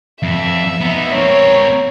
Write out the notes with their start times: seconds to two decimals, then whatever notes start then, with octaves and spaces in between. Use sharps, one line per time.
0.23 F2 E5
0.81 B3 D#4
1.14 C4 A#4 C#5